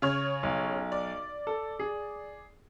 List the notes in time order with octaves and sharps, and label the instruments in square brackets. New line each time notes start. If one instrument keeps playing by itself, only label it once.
[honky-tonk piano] C#3 C#5 F6
[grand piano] B1
[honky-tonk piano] D5
[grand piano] A4
G#4